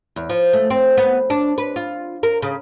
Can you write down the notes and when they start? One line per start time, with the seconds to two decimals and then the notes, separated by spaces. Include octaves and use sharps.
0.16 E2
0.30 F3
0.53 A3
0.70 C4
0.98 B3
1.30 D4
1.58 B4
1.76 F4
2.23 A#4
2.42 C#3